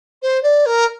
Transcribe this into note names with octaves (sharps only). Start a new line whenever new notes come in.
C5
D5
A#4